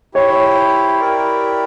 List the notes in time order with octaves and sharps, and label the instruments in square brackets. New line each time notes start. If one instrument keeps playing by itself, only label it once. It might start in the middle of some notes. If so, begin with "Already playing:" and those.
[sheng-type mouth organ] E4 G4 C5 [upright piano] C#5
[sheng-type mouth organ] E4 G4 A#4 D5